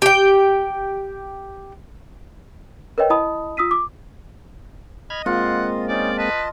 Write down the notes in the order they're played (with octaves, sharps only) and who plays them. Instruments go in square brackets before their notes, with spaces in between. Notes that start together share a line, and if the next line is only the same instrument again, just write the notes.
[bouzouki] G4 G5
[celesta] A#4 B4 C#5 D#5 G5
E4 D#5 A5 B5 D#6
F4 D#6 E6 B6 D#7
D6
[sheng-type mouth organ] D#5 [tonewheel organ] B5 F6 G#6
[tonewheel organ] G#3 A#3 C4 [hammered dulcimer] F4 [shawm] F#5
[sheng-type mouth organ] C#4 D#4 [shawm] D5
[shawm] B4 [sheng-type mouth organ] D#5 A5